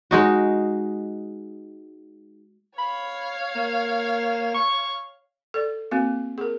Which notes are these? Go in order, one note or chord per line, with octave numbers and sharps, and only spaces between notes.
G#3 D#4 F#4
C#5 F5 B5
A#3
C#6
A4 D5
A#3 C4 F#4
G#4 A#4